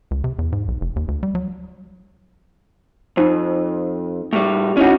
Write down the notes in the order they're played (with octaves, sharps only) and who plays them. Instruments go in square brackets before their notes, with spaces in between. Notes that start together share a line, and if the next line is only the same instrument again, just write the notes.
[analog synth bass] C#2
C3
E2
G#2
B1
F1
D#2
D2
G3
F#3
[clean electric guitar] F2 [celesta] D#4 C5
[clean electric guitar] A2 G3
[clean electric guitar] C#4 D#4 F#4 [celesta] E4 C#5 D6